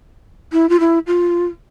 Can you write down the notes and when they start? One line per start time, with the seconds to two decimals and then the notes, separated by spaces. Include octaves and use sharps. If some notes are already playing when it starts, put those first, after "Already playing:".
0.52 E4
0.69 F4
0.80 E4
1.07 F4